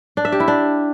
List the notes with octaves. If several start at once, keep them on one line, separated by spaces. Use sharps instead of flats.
D4
E5
G4
E4
D4